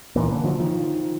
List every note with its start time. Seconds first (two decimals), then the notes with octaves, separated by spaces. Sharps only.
0.16 A#2 E3 A#3
0.31 D3
0.44 D3 F3 F#3
0.60 D#3 F3